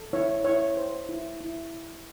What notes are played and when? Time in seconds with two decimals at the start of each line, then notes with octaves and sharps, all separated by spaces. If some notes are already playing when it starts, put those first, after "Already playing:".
Already playing: A4
0.13 E4 C#5
0.45 E4 C#5
0.77 C5
1.09 E4
1.41 E4